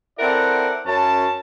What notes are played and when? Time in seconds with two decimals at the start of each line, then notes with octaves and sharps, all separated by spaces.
0.19 C4 E4 A4 A#4 D5 F#5
0.86 F#2 C#4 A5